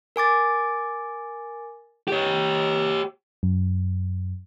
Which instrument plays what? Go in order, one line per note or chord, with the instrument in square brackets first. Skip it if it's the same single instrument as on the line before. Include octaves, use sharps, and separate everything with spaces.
[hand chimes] A#4 G#5 D6 A6
[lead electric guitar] G4 C#5
[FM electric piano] F#2